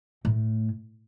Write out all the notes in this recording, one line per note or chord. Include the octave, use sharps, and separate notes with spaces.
A2